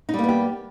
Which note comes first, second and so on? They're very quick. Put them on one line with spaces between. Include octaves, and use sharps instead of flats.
D#4 G3 A#3 B3 G4